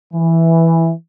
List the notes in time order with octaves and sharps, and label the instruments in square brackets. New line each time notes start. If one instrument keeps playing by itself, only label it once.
[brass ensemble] E3